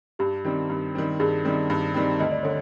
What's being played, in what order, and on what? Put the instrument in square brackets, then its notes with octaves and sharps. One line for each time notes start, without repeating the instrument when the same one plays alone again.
[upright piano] G2 [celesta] G4
[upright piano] D#3 G3 C4
G2
D#3 G3 C4
[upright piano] G2 [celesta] G#4
[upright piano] D#3 G3 C4
G2
D#3 G3 C4
[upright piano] D2 [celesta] D#5
[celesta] D5
[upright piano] D3 [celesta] C#5